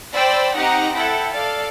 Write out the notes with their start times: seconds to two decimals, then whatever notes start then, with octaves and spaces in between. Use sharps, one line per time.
0.14 C5 D5 G5 B5 E6
0.56 C4 D#4 G4 D#5 F#5 A#5
0.96 E4 A4 F#5 G5
1.34 A4 D5 F5